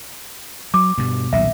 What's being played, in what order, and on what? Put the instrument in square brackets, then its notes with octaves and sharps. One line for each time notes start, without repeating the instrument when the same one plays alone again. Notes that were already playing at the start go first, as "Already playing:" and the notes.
[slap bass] F#3 [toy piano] D6
[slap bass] G2 B2
[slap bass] D#1 B1 A#2 [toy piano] E5